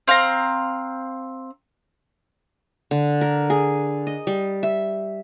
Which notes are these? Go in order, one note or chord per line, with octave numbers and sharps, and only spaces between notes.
C4 F5 F#5 A#5
D3
A#4
G#4
D#5
G3
E5